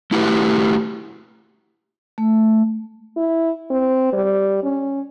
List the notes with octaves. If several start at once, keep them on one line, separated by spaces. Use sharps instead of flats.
A3 E4 F#4 G4 B4
A3
E4
C4
G3
C#4